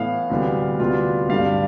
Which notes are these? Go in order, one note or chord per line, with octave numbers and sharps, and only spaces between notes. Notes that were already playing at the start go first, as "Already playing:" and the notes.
Already playing: A2 E3 B3 E4 F5
D2 C3 E3 G3 B3
D2 C3 G3 B3 F4
G2 D3 G3 F5